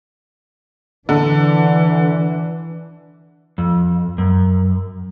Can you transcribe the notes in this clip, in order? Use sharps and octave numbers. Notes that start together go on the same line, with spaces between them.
D3 E3 D4
F2
F#2